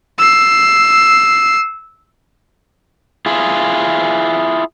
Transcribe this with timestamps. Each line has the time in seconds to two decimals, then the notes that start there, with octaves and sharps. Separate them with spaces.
0.19 E6 C7
3.26 E4 F4 G#4